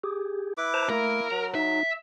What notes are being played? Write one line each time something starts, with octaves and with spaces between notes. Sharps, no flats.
G4 G#4
E4 B4 D6
C5 A5 A#5
A3 A#3 E4 A#4
F#3 A#5
D#4 E5